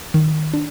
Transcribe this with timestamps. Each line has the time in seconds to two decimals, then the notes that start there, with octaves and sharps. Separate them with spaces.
0.14 D#3
0.53 D4